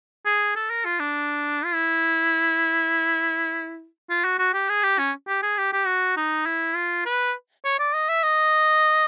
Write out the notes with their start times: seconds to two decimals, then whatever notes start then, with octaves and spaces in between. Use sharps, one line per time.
0.26 G#4
0.56 A4
0.70 A#4
0.85 F4
1.00 D4
1.65 F4
1.74 E4
4.10 F4
4.24 F#4
4.39 F#4
4.54 G4
4.69 G#4
4.83 G4
4.99 C#4
5.28 G4
5.43 G#4
5.58 G4
5.73 G4
5.86 F#4
6.17 D#4
6.46 E4
6.76 F4
7.06 B4
7.65 C#5
7.79 D5
7.94 D#5
8.09 E5
8.23 D#5